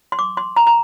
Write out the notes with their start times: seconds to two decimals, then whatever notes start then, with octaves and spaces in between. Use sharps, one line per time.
0.12 C6
0.19 D6
0.37 C6
0.57 A#5
0.67 A#5